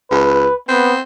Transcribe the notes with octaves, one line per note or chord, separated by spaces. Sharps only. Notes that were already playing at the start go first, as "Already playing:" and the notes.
C#2 B4
B3 C4